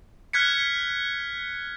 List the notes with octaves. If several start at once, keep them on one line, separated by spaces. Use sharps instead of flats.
F6 F#6 G#6 B6 C#7